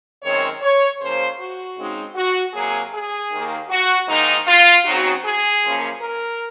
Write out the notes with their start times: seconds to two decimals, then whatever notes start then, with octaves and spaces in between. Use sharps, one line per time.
0.23 F#2 D#3 G#3 C4 C#5
0.61 C#5
1.00 C#3 F3 A#3 C5
1.39 F#4
1.77 C#3 G#3 C4 D#4
2.16 F#4
2.54 C3 F#3 A#3 G#4
2.93 G#4
3.32 D#2 D#3 A#3
3.70 F#4
4.08 G#2 D#3 A#3 D#4
4.47 F4
4.85 C#3 F#3 C4 D#4 F#4
5.24 G#4
5.63 F#2 C#3 F3 A#3 C#4
6.02 A#4